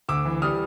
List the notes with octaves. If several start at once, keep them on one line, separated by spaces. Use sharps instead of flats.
D2 D6 E6
E3
G3 D#6 F6